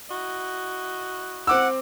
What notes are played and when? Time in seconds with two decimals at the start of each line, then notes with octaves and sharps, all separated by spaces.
0.09 E4 F#4 D#5
1.47 C4 F#5 D6 E6